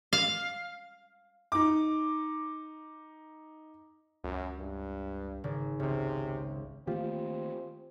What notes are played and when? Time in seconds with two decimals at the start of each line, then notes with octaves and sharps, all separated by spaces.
0.13 F5
1.52 D#4 D6
4.24 C#2 F#2
4.58 G2
5.44 G#1 C#3
5.80 C#2 C3
6.87 D#3 A3 A#3 C4 F4 G4